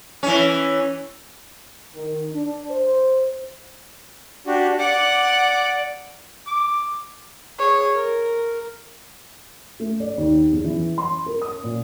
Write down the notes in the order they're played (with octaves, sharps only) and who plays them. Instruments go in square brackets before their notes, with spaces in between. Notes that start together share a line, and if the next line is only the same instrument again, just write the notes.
[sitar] E3 C#4
[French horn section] D#3
D4
C5
[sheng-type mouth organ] D4 F#4 G4
[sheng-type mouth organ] D5 D6 [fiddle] F#5
[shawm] D6
[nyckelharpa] G#4 C#5
A#4
[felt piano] A3
D5
D#2
E2
E3
C6
A#4
D#6
A#2